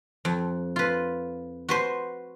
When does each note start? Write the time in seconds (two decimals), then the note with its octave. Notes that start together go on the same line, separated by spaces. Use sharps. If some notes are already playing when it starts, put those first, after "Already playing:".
0.25 F2
0.76 F4 B4
1.69 F#4 B4 C5